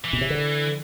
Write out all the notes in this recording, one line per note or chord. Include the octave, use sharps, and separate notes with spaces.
E3
B2
C3
D3